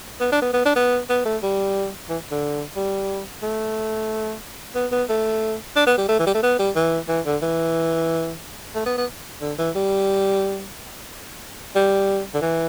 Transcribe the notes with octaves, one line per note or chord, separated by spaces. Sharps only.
B3
D4
B3
B3
D4
B3
B3
A3
G3
E3
D3
G3
A3
B3
B3
A3
D4
B3
G3
A3
E3
G3
A3
B3
G3
E3
E3
D3
E3
A3
B3
B3
D3
E3
G3
G3
D3
E3